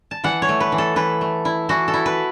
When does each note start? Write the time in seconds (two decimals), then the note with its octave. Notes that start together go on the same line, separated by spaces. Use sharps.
0.11 A5
0.24 E3 F#5
0.42 C#5
0.49 A3
0.60 B4
0.72 E3
0.78 A4
0.96 E3 B4
1.21 A3
1.45 E4
1.69 E3 F#4
1.88 A4
1.94 E4
2.06 B4